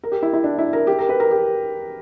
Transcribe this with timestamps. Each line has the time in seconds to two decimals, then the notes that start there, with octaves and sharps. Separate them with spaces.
0.03 A#4
0.12 G4
0.22 E4
0.33 E4
0.44 D4
0.58 E4
0.73 A#4
0.87 G4
0.99 A#4
1.09 B4
1.20 A#4
1.31 G4